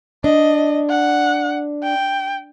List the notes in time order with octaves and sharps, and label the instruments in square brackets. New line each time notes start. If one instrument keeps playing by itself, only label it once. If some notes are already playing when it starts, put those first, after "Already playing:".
[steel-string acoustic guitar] D4 [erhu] D#5
[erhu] F#5
G5